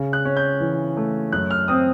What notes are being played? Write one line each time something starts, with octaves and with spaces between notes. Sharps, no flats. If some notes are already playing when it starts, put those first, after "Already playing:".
Already playing: C#3
F#6
C#4
G6
E3
A3
F#2 F#6
F6
C4 D#6